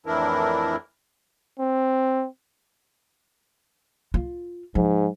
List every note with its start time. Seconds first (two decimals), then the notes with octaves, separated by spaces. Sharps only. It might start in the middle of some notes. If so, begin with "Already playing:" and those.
0.06 F2 A2 E3 D4 E4 A#4
1.59 C4
4.14 F4
4.75 G#2 F3